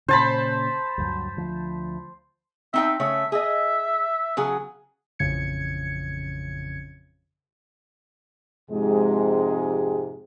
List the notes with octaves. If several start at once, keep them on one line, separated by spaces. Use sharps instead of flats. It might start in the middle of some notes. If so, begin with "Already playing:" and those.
A#2 C#3 C5 A5 B5
D2 G2 F#3
D2 F3
C4 D#4 E5 G5
C#3 A3 C#5 E5
G#4 D#5 E5
C#3 F#3 G#4
A1 F2 C#3 G#6 C#7
F2 G#2 C3 G#3 G4 G#4